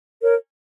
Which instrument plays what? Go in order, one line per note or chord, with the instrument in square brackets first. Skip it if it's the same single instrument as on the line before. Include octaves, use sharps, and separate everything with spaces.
[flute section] A#4 C#5